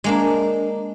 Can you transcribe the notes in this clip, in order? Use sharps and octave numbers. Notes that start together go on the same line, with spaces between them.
G#3 A#3 D4